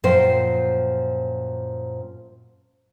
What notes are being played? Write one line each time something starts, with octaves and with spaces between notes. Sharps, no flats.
F#2 A#2 F3 C5 G5